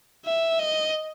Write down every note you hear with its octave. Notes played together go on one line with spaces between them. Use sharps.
E5
D#5